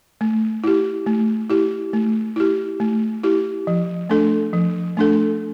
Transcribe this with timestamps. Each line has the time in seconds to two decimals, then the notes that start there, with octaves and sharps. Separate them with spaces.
0.21 A3
0.64 E4 G4
1.06 A3
1.50 E4 G4
1.93 A3
2.36 E4 G4
2.80 A3
3.23 E4 G4
3.67 F3
4.09 A3 D4 A4
4.53 F3
4.97 A3 D4 A4